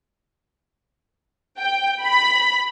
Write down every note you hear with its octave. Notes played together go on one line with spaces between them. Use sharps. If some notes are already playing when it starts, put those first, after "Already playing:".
G5
B5